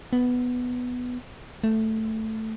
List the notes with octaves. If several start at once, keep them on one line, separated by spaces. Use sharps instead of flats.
B3
A3